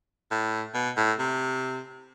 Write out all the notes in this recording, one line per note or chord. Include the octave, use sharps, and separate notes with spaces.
A2
B2
A2
C3